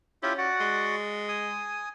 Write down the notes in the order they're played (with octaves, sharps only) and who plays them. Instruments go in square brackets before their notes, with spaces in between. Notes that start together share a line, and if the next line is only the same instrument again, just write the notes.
[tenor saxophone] C#4 [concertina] E4 F4 G4
[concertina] F#4 D5 F#5
[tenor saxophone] G#3
[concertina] G#5 D#6